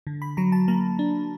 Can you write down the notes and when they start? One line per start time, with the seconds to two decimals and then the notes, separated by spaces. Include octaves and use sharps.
0.07 D3
0.22 B5
0.37 F#3 A#5
0.52 A5
0.68 A#3 A#5
0.99 D4